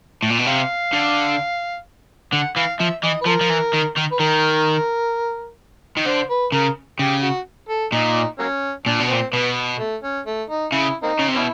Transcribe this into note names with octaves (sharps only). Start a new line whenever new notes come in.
A2
A#2
B2
C3 F5
D3
D3 F#5
E3 F5
F3 E5
E3 D#5
B4
F3 A#4
F3
E3
D#3
D#3
B4
D#3 A#4
D#3
D3 C5
B4
C#3 A#4
C#3 G4
F#4
A4
A#2 D#4
F#3 A#3 C#4
A#2 D4
B2
A#2 C4
B2 B3
A3
C#4
A3
D#4
C#3 E4
A#3 C4 D#4
C#3
C3
B2 B3 C#4 E4